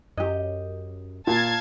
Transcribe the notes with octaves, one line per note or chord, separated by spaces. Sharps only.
F#2 G4 D#5
A#2 F5 A5 G#6